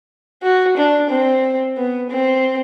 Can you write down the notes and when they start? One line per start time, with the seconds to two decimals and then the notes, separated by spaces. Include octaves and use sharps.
0.43 F#4
0.77 D4
1.10 C4
1.77 B3
2.10 C4